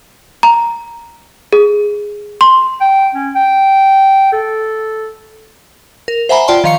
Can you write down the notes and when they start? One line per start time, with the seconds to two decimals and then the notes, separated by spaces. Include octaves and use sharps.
0.43 A#5
1.53 G#4
2.41 C6
2.81 G5
3.15 C#4
3.35 G5
4.32 A4
6.08 A#4
6.29 C5 E5 F#5 G#5 A#5 B5
6.48 F4 D5 G5 A5 C6
6.64 D#3 F3 F5 C#6 C#7